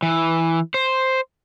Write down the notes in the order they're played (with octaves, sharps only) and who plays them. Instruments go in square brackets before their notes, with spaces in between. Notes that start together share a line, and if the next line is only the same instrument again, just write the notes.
[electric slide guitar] E3
C5